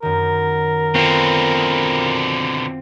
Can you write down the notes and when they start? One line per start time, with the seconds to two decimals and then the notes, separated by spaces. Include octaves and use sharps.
0.02 F#2 D#3 A#4
0.95 B2 D3 C4 F4